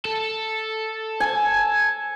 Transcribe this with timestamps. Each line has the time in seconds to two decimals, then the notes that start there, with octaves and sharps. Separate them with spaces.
0.05 A4
1.20 G#5